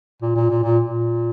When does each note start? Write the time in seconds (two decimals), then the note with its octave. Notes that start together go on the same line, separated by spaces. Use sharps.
0.22 A#2
0.36 A#2
0.50 A#2
0.63 A#2
0.84 A#2